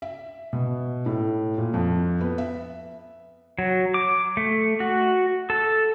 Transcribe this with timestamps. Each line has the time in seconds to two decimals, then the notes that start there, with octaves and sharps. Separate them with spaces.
0.02 E5
0.53 B2
1.06 A2
1.58 A#2
1.74 F2
2.21 B3
2.38 E5
3.59 F#3
3.94 D6
4.37 A3
4.80 F#4
5.50 A4